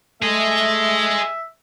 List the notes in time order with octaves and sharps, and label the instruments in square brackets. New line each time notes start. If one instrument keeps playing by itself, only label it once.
[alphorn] A3 [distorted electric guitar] G#4 D#5 [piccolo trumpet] E5